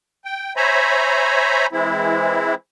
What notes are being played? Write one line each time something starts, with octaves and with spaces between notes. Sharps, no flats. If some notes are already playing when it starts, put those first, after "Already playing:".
G5
C5 C#5 E5 G#5 A#5 B5
E3 G#3 C4 E4